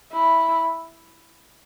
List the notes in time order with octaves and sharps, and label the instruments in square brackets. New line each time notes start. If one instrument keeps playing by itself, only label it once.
[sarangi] E4